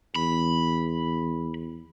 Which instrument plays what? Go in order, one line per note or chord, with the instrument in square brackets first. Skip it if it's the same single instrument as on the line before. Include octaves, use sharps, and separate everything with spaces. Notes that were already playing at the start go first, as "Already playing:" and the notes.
[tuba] E2 [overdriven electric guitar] B5